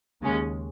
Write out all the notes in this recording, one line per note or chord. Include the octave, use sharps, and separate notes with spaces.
D#2 C#3 G#3 C#4